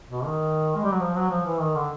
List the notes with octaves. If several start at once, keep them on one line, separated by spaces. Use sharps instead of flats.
B2
D#3
G#3
G3
F#3
F3
F#3
F3
E3
D#3
D3